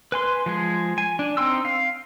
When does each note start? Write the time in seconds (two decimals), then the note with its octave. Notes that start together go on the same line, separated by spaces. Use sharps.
0.12 B4 G#5 C6
0.46 F3 G#3 G#4
0.98 G#5
1.19 D4
1.37 C4 D#4 G5 C6 E6
1.65 F5